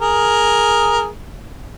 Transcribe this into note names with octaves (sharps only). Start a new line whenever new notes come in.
G#4 A#4